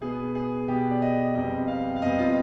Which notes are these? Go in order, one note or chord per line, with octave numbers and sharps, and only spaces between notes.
B2 B3 G#4
G#4
B2 B3 G4
D5
D#5
F2 C3 G3 B3 D#5
F5
F5
F2 C3 G3 B3 D#5
F4